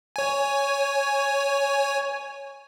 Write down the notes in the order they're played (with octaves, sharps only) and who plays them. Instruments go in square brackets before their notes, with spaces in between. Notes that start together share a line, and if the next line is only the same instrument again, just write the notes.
[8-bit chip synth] C#5 G#5